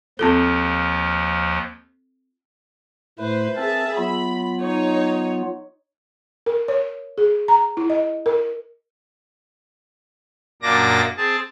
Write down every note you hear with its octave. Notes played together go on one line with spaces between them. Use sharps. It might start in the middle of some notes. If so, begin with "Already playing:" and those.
D#2 F3 C4 F4 A4
A2 A3 E4 B4 C5
C4 G#4 A#4 E5 A5
F#3 B3 F4 B5
D#4 C#5
A#4
C#5
G#4
A#5
E4
D#5
A#4
F#2 A#2 A#3 D4 D6 A#6
C4 G#4 A5